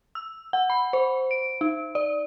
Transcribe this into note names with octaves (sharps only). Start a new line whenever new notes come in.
E6
F#5
B5
C5
D7
D#4
D5